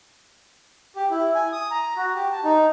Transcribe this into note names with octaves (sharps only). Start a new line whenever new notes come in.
G4
E4
G#5
D#6
A#5
F#4
G4
A5
D#4